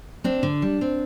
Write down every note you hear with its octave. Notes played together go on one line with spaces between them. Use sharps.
C4 D4
D3
G3
C4